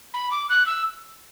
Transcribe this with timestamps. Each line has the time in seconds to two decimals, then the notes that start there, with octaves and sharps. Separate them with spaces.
0.14 B5
0.31 D6
0.49 F#6
0.66 E6